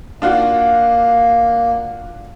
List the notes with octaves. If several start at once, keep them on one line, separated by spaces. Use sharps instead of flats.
A#3 D4 F4 F#4